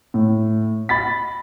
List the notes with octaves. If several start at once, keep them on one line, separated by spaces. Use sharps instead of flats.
A2
B5 A6 B6